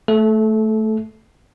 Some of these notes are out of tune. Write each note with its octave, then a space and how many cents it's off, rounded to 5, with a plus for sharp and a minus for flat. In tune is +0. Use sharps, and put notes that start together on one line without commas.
A3 +0 A4 -25